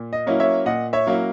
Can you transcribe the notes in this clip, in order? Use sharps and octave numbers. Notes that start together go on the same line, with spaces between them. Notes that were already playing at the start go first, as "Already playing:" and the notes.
Already playing: A#2
D#5
F#3 A#3 C#4 E4
C#5 E5
A#2 D#5 F#5
C#5 E5
F#3 A#3 C#4 E4